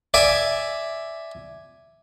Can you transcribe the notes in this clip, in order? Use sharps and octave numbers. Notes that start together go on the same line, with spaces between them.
D5 E5 G#5